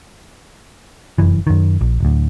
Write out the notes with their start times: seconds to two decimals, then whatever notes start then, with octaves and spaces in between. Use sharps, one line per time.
1.18 F1 F#2 E3
1.47 F#2 D#3
1.81 A#1
2.00 D1 D2